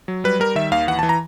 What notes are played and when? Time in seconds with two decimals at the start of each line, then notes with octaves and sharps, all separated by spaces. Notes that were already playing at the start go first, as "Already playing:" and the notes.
0.08 F#3
0.24 G3 B4
0.40 G3 A#4
0.55 D#3 E5
0.72 D#2 F5
0.87 E3 F#5
0.99 A5
1.03 E3
1.09 A#5